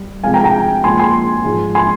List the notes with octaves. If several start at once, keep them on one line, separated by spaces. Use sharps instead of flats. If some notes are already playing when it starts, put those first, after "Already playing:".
Already playing: G3
C3 F3 G#3 F5 G#5
G5 A#5
G5 A#5
A#2 F3 G#3 G#5 C6
G#5 C6
G#2 F3 G#3
G#5 C6